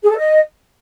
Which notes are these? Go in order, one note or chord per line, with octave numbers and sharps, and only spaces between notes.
G#4
A4
D#5